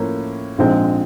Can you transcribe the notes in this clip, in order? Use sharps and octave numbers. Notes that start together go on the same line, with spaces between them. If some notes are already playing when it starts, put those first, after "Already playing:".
Already playing: A2 F3 A#3 C#4
A#1 G#2 F3 G#3 C4